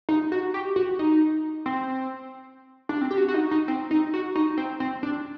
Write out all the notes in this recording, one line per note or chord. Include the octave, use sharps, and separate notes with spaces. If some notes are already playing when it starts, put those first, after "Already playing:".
D#4
F#4
G4
F#4
D#4
C4
D4
C4
G4
F#4
F#4
D#4
D#4
C4
D#4
F#4
D#4
C4
C4
D4